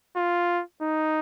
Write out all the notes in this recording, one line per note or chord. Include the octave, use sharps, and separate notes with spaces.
F4
D#4